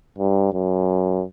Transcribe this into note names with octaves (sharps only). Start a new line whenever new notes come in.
G2
F#2